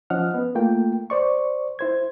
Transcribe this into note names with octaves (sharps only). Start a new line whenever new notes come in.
F3 C#4 D#5 F#5 F6
B3
A3 A#3 F4 G5
C5 D5 C#6
E4 C5 G#6